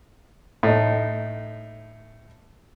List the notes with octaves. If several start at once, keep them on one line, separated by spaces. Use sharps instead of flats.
A2 D#4